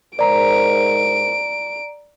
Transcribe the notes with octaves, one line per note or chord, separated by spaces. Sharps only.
G#2 A#4 C5 D5 A#5 D7